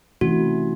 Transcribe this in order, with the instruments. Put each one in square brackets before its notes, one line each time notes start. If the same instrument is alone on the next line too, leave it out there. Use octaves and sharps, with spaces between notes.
[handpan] C3 E3 A3 C#4 E4 [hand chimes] F#4